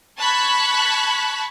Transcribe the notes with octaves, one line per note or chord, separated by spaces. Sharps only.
A5 B5 C#6 F#6 G#6 B6